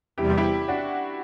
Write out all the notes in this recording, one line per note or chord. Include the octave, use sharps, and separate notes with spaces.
E2 C3 G3 E4 G4
E4 G4
D4 F#4